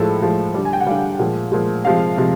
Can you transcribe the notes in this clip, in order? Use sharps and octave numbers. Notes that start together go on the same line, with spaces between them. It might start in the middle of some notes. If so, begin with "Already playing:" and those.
Already playing: A2 F3 G#3 A4
A2 F3 G#3
D3 G3
G#5
G5
F#5
D3 G3 F5
A#2 F3 G#3
A#2 F3 G#3
C3 F3 G#3 F5
C3 F3 G#3